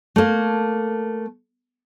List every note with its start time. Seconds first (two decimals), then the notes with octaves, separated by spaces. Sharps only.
0.16 A3 A#3